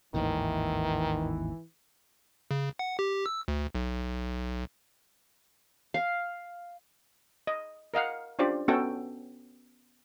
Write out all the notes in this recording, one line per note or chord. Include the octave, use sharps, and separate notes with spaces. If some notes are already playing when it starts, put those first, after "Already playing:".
G#1 D#2 A2 D#3 E3
C#3
F#5
G4
E6
D2
B1
F5
D#5
A#4 D#5 F5 F#5
C#4 D4 F4 G4 C5 D5
B3 C#4 F#4 A4 G5